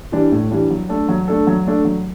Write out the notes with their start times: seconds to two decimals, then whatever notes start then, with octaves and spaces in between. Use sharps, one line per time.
0.12 E3 G3 D4
0.31 A2
0.51 E3 G3 D4
0.70 F#3
0.89 A3 D4 A4
1.08 F#3
1.28 A3 D4 A4
1.47 F#3
1.66 A3 D4 A4
1.85 F#3